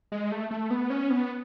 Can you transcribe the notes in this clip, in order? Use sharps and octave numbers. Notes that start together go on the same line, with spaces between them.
G#3
A3
A3
B3
C#4
B3